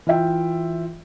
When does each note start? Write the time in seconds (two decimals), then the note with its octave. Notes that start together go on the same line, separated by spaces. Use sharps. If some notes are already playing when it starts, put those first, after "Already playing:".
0.07 E3 F4 E5 G5